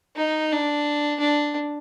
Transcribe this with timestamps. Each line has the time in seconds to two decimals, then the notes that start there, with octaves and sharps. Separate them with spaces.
0.17 D#4
0.52 D4
1.20 D4